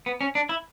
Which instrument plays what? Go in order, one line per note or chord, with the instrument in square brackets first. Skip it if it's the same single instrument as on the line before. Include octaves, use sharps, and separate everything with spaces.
[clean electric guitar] B3
C#4
D4
E4